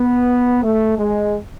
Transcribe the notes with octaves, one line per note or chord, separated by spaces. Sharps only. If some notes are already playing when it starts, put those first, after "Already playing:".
Already playing: B3
A3
G#3